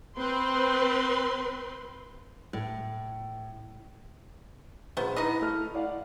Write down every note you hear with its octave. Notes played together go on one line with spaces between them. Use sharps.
C4 B4 C6
A2
A#1 B3 C5
D#4 E4 B4 D#5
A3 A4 F6
D5 F5 F#5